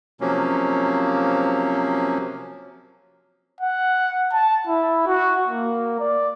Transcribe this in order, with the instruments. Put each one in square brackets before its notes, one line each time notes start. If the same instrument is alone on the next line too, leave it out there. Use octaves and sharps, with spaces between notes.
[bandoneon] C3 F3 F#3 A#3 C#4
[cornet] F#5
A5
E4
F#4
A#3
D5